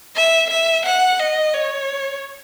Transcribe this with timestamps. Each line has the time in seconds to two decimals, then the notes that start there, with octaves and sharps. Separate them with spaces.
0.16 E5
0.50 E5
0.85 F#5
1.19 D#5
1.54 C#5